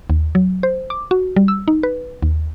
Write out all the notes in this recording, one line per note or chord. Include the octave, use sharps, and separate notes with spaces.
D#2
F#3
C5
D6
F#4
G3
E6
D#4
B4
D#2